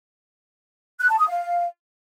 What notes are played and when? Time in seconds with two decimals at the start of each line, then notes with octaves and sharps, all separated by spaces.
1.01 F#6
1.10 A5
1.19 D#6
1.28 F5